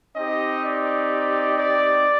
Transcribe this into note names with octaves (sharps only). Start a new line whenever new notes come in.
C4 D#4 G4 D#5
D5
D5